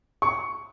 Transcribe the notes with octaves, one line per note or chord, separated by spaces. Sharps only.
C#6